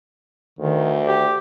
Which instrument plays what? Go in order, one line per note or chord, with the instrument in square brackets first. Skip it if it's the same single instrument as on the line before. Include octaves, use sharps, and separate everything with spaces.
[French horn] D2 [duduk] D#3
[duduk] G4